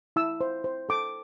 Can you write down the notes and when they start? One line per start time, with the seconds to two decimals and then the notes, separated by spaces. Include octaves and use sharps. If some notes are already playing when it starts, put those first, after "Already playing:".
0.16 E4 E6
0.41 C5
0.64 C5
0.89 A4 D6